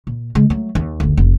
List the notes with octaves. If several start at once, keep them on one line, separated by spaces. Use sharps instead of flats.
A#2
C#3 G#3
F#3 A3
D#2
F#1 D2
F1